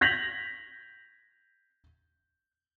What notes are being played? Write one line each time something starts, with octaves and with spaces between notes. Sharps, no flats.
G6 G#6 A#6 B6 F7 F#7